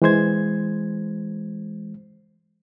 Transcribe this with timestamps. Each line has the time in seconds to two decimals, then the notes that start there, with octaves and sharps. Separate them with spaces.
0.02 E3 G#3 C5 G#6